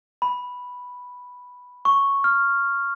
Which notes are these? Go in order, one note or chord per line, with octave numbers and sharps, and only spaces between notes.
B5
C#6
F6